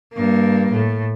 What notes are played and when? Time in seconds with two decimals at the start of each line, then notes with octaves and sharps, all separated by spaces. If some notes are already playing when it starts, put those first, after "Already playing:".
0.13 G2 A#3
0.72 A2